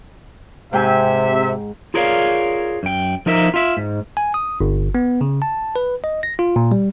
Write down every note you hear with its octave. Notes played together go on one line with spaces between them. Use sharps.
G#2 C3 E5 G5 G#5
F4 G#4 A#4 C#5 D5 F5
F#2 G5
F3 D#4 A#4 E5
F4 E5
G#2
G#5
D#6
G1
B3
C#3
A5
B4
D#5
A#6
F4
A#2
G3